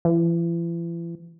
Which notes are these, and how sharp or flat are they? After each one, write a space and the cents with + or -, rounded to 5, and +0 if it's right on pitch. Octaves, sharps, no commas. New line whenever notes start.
E3 +40